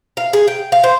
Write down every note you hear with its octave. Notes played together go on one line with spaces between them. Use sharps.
F5
G#4
G5
F5
C5